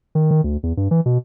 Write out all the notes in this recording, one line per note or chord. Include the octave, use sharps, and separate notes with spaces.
D#3
D#3
D2
E2
G2
E3
B2